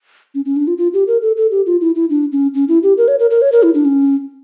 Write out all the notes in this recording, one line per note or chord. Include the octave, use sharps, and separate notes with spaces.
C#4
C#4
D4
F4
F4
G4
A#4
A4
A4
G4
F4
E4
E4
D4
C#4
C#4
E4
G4
A#4
C#5
A#4
A#4
C#5
A#4
E4
D4
C#4